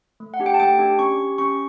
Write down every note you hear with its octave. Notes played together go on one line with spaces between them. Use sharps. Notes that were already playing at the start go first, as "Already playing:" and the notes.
A3
F#5
D4 G4
G5
A5
A3 G5
D4 G4
C#4 C#6
G4
C#4 C#6